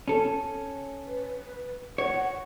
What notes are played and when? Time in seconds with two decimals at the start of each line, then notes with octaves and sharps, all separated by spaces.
0.08 C#4 A4
1.05 B4
1.98 C#5 F#5